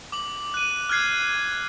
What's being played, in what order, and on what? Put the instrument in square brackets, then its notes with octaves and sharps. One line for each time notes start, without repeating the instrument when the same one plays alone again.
[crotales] D6 F#7
F#6 D#7
F6 F#6 G#6 C7